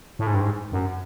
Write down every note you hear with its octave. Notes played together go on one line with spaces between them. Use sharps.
A2
G#2
G2
G#2
F#2